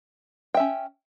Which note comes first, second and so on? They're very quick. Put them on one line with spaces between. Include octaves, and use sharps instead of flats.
G5 E5 C#4